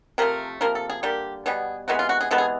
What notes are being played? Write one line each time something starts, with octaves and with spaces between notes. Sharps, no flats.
C3 F3 A3 A#4
C3 F3 A#3 A#4
A4
G#4
D3 G3 A#3 G4
B2 G3 B3 G#4
C3 E3 G#3 B3 F#4
F4
F#4
G#4
C3 E3 G#3 B3 A4
G#4